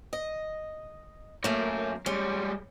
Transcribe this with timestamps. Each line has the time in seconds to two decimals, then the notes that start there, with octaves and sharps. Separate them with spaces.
0.13 D#5
1.44 F#2 A3 A#3 C#5
2.06 G3 G#3 C#4